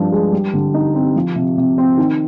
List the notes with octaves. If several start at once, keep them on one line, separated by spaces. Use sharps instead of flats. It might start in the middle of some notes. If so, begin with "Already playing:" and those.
Already playing: G2 F3 D4
G#3
G3
D3
D#4
C4
F3
C3
C3
C4
D#3